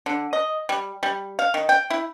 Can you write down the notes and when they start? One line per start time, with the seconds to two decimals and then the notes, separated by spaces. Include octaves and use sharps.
0.06 D3
0.33 D#5
0.69 G3
1.03 G3
1.39 F5
1.54 D#3
1.69 G5
1.90 E4